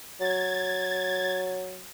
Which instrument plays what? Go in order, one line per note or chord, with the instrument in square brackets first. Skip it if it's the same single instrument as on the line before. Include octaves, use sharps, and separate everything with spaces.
[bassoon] F#3 [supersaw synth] G#6 A6